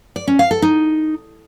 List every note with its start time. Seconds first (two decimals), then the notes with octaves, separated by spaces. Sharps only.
0.16 D5
0.27 C#4
0.39 F5
0.51 A4
0.62 D#4